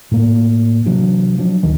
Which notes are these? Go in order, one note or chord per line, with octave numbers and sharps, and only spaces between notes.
A2 A#3
C3 E3 F#3 D4
F3 F#3 D4
D2 D#3 E3